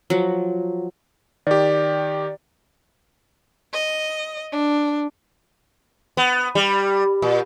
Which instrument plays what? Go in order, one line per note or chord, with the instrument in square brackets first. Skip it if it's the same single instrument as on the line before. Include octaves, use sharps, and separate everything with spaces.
[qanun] F3 F#3
[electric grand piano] D#3 G4 [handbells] D5
[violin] D#5
D4
[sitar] B3
G3
A#2